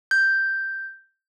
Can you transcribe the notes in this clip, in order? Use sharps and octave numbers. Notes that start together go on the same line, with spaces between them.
G6